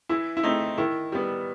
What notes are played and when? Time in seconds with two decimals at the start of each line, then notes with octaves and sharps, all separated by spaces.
0.09 E3 E4
0.37 E4
0.43 A3 C4 D#4
0.78 D#3 E4
1.12 G3 B3